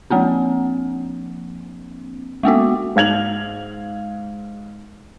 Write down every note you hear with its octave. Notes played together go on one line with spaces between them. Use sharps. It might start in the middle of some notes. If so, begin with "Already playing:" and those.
F3 A#3 C4 D4
G#3 A#3 B3 F#4
G#2 F5 G#6 F7 F#7